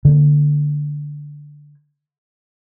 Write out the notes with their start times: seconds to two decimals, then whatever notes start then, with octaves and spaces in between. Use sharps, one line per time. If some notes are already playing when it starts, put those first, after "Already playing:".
0.05 D3 A#3